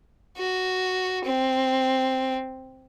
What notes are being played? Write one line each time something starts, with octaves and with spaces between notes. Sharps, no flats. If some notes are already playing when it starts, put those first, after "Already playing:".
F#4
C4